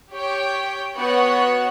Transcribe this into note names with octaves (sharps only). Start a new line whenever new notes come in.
G4 C#5 G5
B3 F#4 C#5 F#5